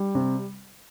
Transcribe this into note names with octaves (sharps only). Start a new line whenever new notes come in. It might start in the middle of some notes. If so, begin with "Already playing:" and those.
Already playing: G3
C3